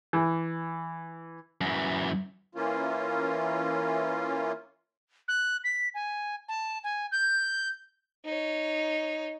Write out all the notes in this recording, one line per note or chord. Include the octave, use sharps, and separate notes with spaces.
E3
F#2 E3
E3 A#3 C#4 F4
F#6
B6
G#5
A5
G#5
G6
D#4 C#5